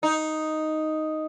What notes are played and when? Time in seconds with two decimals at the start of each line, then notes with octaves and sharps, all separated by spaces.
0.03 D#4